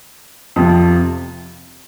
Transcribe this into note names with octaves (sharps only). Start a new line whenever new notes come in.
F2 C3 F3